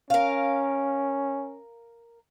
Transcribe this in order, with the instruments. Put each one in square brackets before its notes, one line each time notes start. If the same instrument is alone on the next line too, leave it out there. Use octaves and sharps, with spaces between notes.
[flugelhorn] C#4 [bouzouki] A#4 F5